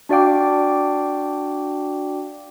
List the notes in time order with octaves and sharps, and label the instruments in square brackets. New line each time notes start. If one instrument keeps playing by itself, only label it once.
[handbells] D4 F#4 D5 F5 G5 D6